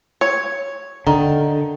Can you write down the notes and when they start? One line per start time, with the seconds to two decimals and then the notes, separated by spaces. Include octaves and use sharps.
0.21 C#5
1.07 D3 D#3